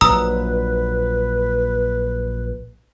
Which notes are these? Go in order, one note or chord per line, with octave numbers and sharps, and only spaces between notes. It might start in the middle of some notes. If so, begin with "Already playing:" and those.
A#1 A#2 F#3 B4 A#5 D#6 E6